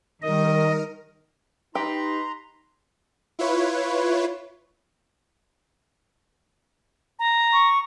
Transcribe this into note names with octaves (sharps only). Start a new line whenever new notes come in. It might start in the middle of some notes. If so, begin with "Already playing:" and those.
D#3 G3 D#4 A#4 D#5
D#4 G4 B4 A#5 C6
E4 F4 B4 C#5
A#5
C#6